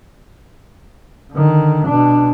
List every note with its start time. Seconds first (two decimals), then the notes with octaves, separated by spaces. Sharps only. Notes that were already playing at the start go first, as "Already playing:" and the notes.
1.32 D3 D#3
1.87 B2 D4